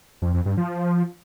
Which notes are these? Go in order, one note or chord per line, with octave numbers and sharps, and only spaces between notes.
F2
F2
G2
F3